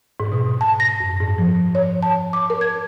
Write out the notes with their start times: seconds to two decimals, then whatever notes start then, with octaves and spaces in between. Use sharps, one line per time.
0.20 G#2
0.32 B2
0.61 A5
0.80 A#6
1.00 F#2
1.21 G#2
1.38 F3
1.75 C#5
2.03 A5
2.33 D6
2.50 A#4
2.61 G#6